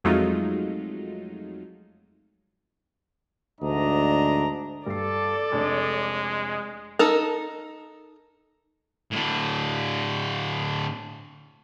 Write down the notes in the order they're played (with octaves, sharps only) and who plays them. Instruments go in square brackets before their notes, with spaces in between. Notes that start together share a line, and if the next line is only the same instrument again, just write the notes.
[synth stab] F2 F#3 G#3 A3 D#4 F4
[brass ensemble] D2 G#2 D4 D#5 A#5
[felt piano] G2 C7 [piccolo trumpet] A4 [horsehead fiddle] D5
[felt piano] F1 D4 [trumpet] G#3
[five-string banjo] D#4 A4 A#4
[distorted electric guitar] A2 D3